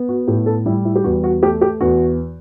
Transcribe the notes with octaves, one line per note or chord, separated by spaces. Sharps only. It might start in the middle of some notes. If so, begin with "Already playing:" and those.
Already playing: B3
F#4
A2 G4
A4
G3 E4
E4
G4
E2 F#4
F#4
A3 G4
G4
E2 F#4